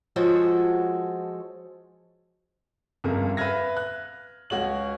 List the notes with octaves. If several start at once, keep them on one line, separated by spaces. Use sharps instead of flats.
F3 G#3 F#4 A4 C5 C#5
G1 F2 C#3 A#4
B4 E5 F5 F6 G#6 A#6
F#6
C#2 F#4 C#5 F#7